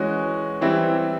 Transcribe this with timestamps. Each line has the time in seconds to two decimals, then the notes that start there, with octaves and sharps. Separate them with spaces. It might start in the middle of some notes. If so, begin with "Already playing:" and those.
Already playing: E3 G#3 C#4 F#4
0.61 E3 G3 C4 E4